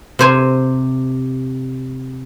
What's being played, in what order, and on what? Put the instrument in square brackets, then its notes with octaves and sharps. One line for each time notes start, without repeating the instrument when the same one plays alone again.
[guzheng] C3 C5 G#5